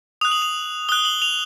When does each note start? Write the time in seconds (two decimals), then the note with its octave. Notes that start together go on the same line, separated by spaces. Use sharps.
0.21 D#6 F#6 F7
0.31 F#7
0.42 F7
0.89 D#6 F#6 G7
1.05 F#7
1.22 F7